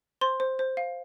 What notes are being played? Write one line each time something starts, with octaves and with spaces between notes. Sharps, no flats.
C5 C6
C5
C5
F5